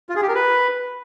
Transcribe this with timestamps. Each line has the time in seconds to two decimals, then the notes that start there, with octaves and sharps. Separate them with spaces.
0.09 F4
0.16 G#4
0.22 G4
0.28 A#4
0.35 B4